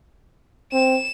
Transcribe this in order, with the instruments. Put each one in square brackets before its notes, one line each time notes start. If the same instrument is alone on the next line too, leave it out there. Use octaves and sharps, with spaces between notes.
[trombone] C4 [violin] E7